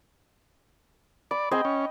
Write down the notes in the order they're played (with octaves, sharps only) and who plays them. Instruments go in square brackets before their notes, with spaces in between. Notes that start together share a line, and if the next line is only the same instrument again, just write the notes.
[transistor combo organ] D5 [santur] B5
[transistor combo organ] C4 G#4 [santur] D#5 G5
[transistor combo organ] C#4